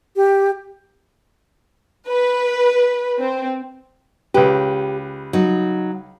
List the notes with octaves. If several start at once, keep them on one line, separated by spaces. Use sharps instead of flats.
G4
B4
C4
C#2 G4 B4
F#3 D#4